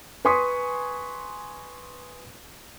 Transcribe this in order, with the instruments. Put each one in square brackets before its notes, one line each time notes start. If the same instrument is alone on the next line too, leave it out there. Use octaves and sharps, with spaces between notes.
[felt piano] B4 G#5 C6 C#6 D#6 B6